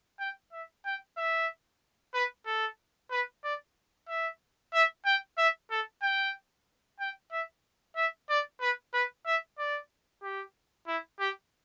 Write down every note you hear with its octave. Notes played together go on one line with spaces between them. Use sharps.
G5
E5
G5
E5
B4
A4
B4
D5
E5
E5
G5
E5
A4
G5
G5
E5
E5
D5
B4
B4
E5
D5
G4
E4
G4